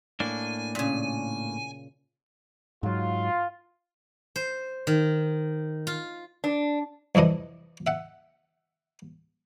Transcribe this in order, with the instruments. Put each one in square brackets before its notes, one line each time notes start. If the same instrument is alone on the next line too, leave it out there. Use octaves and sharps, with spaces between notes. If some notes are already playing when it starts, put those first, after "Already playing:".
[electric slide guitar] A2 A#3 D4 [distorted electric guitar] G#5
[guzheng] A#2 C#3
[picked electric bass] G#2 F#3 [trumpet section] F4
[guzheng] C5
D#3
F4
[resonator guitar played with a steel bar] D4
[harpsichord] C2 F2 E3 D4 D#5
E5 F#5